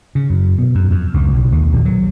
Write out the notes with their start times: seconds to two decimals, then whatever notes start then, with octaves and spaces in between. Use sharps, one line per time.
0.15 C#3
0.30 F#2
0.58 B2
0.75 F#2
0.91 F2
1.14 C#2
1.33 B1
1.52 D#2
1.72 A#1
1.85 F#3